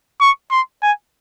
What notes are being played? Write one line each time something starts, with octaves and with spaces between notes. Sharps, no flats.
C#6
C6
G#5